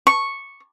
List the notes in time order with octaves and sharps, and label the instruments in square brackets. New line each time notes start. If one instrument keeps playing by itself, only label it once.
[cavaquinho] C#6